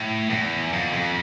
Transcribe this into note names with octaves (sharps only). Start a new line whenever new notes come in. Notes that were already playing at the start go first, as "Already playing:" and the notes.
Already playing: A2
E2
F2
F2